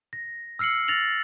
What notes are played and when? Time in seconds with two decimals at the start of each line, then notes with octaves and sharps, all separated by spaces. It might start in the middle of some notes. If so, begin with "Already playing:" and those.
0.13 A#6
0.59 E6 F6 C7 C#7 F#7
0.88 F6 A6 A#6 F7 F#7